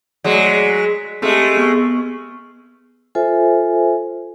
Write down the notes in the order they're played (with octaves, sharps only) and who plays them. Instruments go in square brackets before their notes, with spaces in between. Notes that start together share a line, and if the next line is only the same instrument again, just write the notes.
[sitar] F#3 G#3 [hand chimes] A3 D5
[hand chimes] B6
[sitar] G#3 A3 [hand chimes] C4 G4
[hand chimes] B3 C#6
[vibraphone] F4 A4 C5 E5 G#5